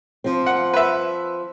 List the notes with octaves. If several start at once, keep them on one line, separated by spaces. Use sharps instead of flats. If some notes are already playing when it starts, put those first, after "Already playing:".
F3 C4
F#5
B4 E5